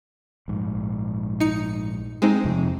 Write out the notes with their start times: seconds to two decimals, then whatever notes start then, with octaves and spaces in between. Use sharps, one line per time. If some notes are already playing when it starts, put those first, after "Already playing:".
0.48 A#1 G#2
1.40 D#4 C#7
2.22 G#3 C4 D#4
2.45 F2 C3 F3